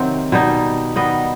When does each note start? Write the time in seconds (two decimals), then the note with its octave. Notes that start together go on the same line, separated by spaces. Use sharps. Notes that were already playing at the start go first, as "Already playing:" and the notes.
Already playing: C3 D#3 F#3 C4 F#5
0.32 B2 G3 D#4
0.96 D#3 G3 B3 D#5